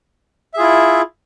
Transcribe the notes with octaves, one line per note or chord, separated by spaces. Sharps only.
E4 F4 G#4 E5